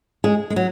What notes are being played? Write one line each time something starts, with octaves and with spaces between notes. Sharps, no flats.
G#3 G#4
G#3
F#3